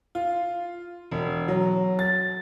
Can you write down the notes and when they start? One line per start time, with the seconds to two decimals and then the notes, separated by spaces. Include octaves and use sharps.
0.15 F4
1.11 E1
1.48 F#3
1.99 A6